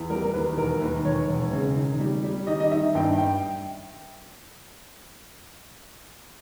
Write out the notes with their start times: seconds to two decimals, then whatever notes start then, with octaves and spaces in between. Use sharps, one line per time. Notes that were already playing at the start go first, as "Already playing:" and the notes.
Already playing: E2
0.10 G3 A#4
0.21 A#4
0.33 D#2 B4
0.57 E1 A#4
0.81 D#2 B4
1.04 E1 C#5
1.28 E1
1.53 C#3
1.76 D#3
2.00 G3
2.23 G3
2.47 D#3 D#5
2.60 D#5
2.71 D#3 E5
2.95 G2 G5
3.18 G5